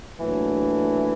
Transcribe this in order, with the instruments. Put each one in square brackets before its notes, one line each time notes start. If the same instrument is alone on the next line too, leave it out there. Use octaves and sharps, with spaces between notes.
[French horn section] A#2 F#3 A3 D4 [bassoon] E3